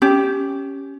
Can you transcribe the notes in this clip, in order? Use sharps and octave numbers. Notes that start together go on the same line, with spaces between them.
C#4 G4